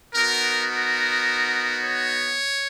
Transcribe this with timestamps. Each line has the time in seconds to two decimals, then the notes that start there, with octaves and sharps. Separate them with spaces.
0.14 B3 D#4 F#4 A#4
0.71 A#4
1.83 C#5